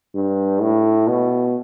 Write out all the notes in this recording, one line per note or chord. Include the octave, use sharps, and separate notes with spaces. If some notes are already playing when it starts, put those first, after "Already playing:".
G2
A2
B2